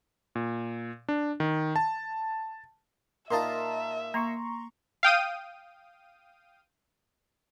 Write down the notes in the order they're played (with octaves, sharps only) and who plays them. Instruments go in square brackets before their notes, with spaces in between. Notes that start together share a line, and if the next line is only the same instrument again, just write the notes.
[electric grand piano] A#2
D4
D#3
A5
[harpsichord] A#2 D#4 F4 [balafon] A#4 [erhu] E5 [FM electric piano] A5 A#5 C6
[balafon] A#3 [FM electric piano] A#5 C6 C#6
[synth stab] F5 G5 D#6 D#7